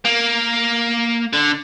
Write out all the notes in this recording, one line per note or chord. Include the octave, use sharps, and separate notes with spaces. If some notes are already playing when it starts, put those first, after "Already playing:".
A#3
D3